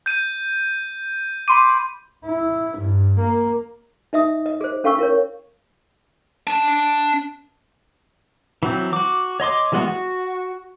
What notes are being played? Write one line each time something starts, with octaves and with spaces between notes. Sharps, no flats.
G6 D#7
B5 C6 D6 D#7
E4
G2
A#3
D#4 D#5 E5 D#6
D#5
G#4 C5
C#4 A4 F5 G5 C#6 E6
E4 A#4 C#5
D4 A5
E3 F#3 C4
F#4 D6
C#5 D#5 C6 D6
E3 G3 G#3 B3 F#4
F#4